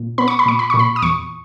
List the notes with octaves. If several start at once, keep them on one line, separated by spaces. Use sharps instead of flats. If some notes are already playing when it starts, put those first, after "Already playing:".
Already playing: A#2
B3 B5
C#6
B5
A#2 C#6
B5
A#2 C#6
B5
D#6
E2 C#6